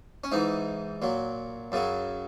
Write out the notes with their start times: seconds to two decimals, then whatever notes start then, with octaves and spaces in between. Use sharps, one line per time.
0.24 C#4
0.32 G#2 E3 D#4
1.02 A#2 F#3
1.72 F#2 C#3 F#3